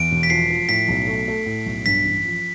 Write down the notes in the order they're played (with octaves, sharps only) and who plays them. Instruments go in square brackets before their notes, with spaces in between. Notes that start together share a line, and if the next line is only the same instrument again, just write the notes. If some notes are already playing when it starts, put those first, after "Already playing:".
Already playing: [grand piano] E2 [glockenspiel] D7
[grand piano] E1
[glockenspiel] B6
[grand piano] F3 [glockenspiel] C7
[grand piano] F3
[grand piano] A2 [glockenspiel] B6
[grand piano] B1
A3
A3
A2
B1
[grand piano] G2 [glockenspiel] B6
[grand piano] A1
F3